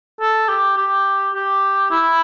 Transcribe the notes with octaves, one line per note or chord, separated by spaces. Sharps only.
A4
G4
G4
G4
E4